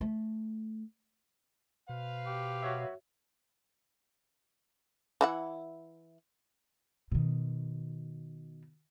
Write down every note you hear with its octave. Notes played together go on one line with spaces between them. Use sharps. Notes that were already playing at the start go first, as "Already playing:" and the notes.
A3
B2 B4 C5 F5
G4
F#4 C#5 E5
E3 E4 F#5
B2 D#3